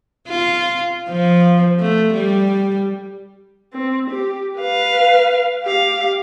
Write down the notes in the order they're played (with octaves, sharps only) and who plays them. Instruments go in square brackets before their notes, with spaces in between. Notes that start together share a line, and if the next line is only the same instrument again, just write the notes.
[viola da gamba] F4
F3
A3
G3
[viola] C4
G4
B4 F5
G4 F5